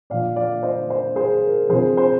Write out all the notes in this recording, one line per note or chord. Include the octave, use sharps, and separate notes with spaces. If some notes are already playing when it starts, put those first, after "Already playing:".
A#2 F3 D5 F5
D5 F5
C5 D#5
C5 D#5
G#4 C5
A#4
C3 F3 G#4 C5
C5